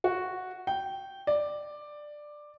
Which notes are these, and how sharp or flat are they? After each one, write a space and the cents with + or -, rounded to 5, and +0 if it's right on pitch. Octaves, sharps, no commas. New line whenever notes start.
F#4 -5
G5 -10
D5 +10